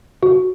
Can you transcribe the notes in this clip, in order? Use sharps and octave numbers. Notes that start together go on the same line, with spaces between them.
F#4